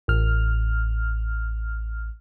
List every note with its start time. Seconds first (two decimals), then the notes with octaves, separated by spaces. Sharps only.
0.08 A1 F6